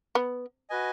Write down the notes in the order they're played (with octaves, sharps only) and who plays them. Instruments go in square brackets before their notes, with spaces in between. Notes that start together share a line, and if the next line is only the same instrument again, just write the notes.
[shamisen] B3
[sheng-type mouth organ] F#4 B4 D#5 G#5